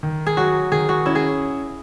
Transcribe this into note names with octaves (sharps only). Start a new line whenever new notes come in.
D#3
G#4
F#3 F#4
D#3 G#4
F#4
C#4 E4
G#4